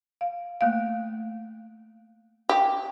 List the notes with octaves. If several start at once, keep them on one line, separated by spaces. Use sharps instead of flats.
F5
A3 A#3 F5
G4